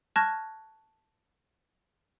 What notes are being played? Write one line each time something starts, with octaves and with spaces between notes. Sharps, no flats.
A5 C#6 F6 F#6 G#6 A#6